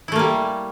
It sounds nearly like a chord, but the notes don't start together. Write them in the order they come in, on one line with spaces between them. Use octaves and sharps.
E4 A3 A#3 G3